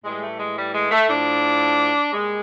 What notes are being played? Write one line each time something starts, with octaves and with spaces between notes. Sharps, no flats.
A2 E3 G3 G#3
A3
G#3
G3
G#3
A3
A2 F3 D4
A#2 G3 G#3